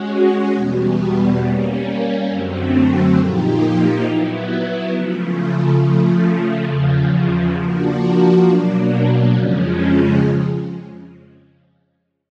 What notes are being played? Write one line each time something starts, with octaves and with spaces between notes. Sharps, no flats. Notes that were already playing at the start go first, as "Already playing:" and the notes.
Already playing: G#3 C#4 F#4
E2 B2 G3 B3
G3 A#3 C#4
F#2 D3 F#3 A3 C4
A#2 F3 A#3 D#4 G4
F#3 B3 E4
C#3 F3 A3
C#3 F3 A3
E2 C#3 F3
F3 A#3 D4 F#4
B2 F#3 A#3 D4
F2 C#3 F3 G#3 C#4